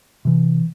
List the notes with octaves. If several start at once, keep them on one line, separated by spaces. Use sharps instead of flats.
C3 E3